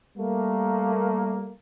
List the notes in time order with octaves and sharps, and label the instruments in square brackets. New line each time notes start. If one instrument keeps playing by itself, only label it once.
[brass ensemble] G3 A3 A#3